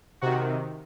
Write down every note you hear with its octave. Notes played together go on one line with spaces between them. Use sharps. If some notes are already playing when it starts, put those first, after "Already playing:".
C3 D#3 F#4